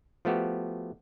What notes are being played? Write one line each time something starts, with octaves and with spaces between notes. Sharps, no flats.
F3 A3 B3 F#4 G4